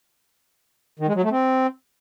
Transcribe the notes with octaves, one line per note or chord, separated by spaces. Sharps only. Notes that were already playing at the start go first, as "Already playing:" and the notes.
D#3
G#3
F#3
A3
C4